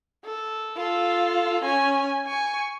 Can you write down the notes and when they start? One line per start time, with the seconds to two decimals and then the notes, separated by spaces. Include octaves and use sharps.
0.25 A4
0.77 F4 A4
1.64 C#4 G#5
2.25 G#5 C#6